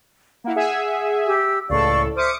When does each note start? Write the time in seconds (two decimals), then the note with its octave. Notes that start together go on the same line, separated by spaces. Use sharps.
0.44 A#3 E4 F#5
0.56 G#4 E5 G#5
1.27 G4 E6
1.70 C#2 A2 A4 D5 F5 C#6
2.16 C5 E5 D6 D#6 F6 C#7